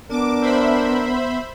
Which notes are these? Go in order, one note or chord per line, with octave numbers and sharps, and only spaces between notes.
B3 D4 A#4 D6
C5 E5 B5